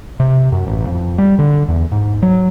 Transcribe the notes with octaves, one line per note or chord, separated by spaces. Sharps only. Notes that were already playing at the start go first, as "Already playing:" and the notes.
C3
F#2
A1
F2
G3
D3
E2
G#2
F#3